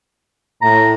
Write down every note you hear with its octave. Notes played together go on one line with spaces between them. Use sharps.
A2 A#5